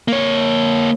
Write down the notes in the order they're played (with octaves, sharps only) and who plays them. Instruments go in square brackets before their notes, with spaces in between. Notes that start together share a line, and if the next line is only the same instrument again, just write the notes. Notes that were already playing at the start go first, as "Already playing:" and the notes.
[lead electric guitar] A#3 C#5